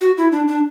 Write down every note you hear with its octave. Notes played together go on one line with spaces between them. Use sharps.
F#4
E4
D4
D4